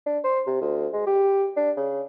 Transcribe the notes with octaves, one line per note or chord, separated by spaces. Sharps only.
D4
C5
C3
D2
G#3
G4
D4
C#3